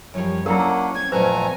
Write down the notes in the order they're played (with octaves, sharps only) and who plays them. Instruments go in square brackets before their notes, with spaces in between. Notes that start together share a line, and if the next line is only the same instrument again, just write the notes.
[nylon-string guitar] F#2 F3 G3 [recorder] C#5
[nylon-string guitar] F#3 [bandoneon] A#3 C#4 D4 [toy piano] E4 A#4 [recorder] F#5
[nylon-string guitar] C4 C#4 [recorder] G#6
[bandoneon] F2 A3 A#5 [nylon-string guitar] A#2 F#3 [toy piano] B4 C5 [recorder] G#5